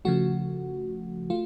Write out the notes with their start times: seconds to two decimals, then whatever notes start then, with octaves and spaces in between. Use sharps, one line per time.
0.05 C#3 F3 A3 F#4
1.30 A3 F4